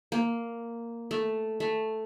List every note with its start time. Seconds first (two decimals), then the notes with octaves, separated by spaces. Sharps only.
0.12 A#3
1.11 A3
1.60 A3